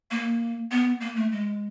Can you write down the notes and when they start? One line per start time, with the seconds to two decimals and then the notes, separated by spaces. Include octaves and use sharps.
0.11 A#3
0.71 B3
1.01 A#3
1.16 A3
1.32 G#3